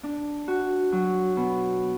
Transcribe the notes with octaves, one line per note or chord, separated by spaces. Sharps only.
D4
F#4
F#3
B2